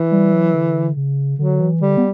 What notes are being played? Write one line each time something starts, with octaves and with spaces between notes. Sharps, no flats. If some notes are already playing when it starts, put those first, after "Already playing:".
Already playing: E3
G3
F#3
D3
C#3
D3 F#3
E3
D3 G3
B3